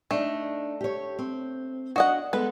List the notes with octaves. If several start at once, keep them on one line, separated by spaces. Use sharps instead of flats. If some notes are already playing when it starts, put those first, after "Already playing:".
A3 D4 D#4
G4 C#5
C4
D4 F#4 D#5 F#5
G#3 B3 A4 B4